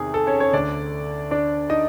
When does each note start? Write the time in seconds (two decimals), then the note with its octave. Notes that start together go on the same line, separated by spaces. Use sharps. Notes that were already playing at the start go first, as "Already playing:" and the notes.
Already playing: E2 C3 D#3 G#4
0.14 A4
0.27 C#4 C#5
0.40 C#4 C#5
0.53 D2 D3 D4 D5
1.31 D4 D5
1.69 D#4 D#5